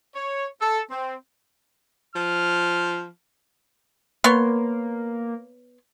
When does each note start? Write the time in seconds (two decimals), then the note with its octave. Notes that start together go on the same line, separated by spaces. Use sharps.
0.15 C#5
0.61 A4
0.90 C4
2.16 F3 F6
4.24 A#3 B3 C#5 C6